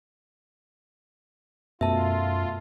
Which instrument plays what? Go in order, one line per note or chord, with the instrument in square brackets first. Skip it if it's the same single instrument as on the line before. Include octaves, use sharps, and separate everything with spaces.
[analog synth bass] F#2 [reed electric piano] B2 A3 [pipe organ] F4 [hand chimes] E5 A5